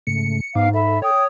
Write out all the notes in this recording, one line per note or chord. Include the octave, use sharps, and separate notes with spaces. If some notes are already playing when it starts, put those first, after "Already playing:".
G#2 C#3 A3 C#7
G#2 B3 D#4 F5 D6
A4 E5 B5
C#5 G5 D#6